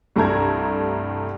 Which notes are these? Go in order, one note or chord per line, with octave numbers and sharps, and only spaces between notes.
C2 G2 A3 A5 A#5 G#6